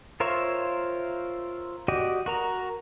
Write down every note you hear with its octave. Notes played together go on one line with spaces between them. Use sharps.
F4 A#4 C5 C#5 E5
F#4 G4 D5 D#5
F#4 A#4 A#5